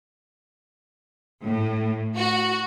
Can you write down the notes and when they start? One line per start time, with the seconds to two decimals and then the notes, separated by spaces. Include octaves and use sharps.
1.44 A2
2.17 F#4